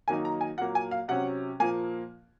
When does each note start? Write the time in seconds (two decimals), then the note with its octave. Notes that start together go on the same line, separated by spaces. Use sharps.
0.08 D#3 F#3 A#3 D#4 G#5
0.25 A#5
0.41 G#5
0.58 A#2 F#3 A#3 F#5
0.75 G#5
0.91 F5
1.08 C3 F#3 C#4 F#5
1.60 A#2 F3 A#3 G#5